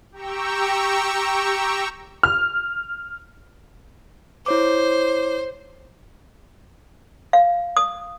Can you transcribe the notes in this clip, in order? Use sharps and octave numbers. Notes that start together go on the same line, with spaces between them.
G4 G5 A#5 C#6 E6
F6
E4 C5 C#5 D6
F5
D#6